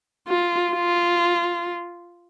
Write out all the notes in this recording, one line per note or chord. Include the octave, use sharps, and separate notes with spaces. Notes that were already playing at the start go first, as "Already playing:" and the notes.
F4
F4